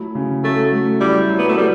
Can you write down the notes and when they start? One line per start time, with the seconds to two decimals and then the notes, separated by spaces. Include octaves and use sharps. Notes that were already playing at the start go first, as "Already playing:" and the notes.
Already playing: F#3 A3 E4
0.15 C#3
0.43 F#3 A3
0.72 A3
1.00 G3 E4
1.29 F#3
1.38 B3
1.49 A3
1.57 G3 B3